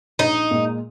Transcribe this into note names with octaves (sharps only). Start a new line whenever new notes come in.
A#1 D#4
A#2 G#3